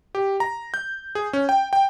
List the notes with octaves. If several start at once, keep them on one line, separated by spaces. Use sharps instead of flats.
G4
A#5
G6
G#4
C#4
G5
G5